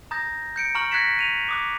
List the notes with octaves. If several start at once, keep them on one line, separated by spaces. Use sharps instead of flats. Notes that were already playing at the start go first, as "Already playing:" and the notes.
A#5 D#6 G6 A6 A#6
G6 C#7 D7
A#5 C#6 F6 F#7
F#6 G#6 A#6 B6 C#7 E7
D#7 F7
D6 D#6 F#6